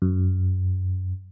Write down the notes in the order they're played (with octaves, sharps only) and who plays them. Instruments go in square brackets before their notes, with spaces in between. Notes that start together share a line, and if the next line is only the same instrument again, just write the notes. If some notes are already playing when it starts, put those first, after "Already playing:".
[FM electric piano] F#2